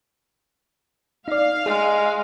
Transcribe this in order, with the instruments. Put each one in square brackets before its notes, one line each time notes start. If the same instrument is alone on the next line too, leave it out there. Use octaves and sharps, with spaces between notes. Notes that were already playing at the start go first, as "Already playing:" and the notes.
[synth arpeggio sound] D#4 D5 [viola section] F5
[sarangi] G#3 [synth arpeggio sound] G#4